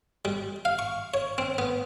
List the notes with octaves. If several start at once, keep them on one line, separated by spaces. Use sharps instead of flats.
G3
F5
C#6
C#5
C4
B3